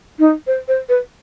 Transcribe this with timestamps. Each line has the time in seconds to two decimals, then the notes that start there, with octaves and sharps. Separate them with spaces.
0.19 D#4
0.47 C5
0.68 C5
0.89 B4